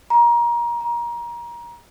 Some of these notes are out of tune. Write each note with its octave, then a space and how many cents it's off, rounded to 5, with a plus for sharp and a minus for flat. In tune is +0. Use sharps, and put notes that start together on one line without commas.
A#5 +25
A#5 +25